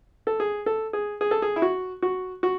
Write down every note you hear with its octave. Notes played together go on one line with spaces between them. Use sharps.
A4
G#4
A4
G#4
G#4
A4
G#4
E4
F#4
F#4
F#4